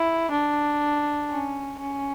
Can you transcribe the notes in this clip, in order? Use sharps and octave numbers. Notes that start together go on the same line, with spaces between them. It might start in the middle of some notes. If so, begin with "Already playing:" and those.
Already playing: E4
D4
C#4
C#4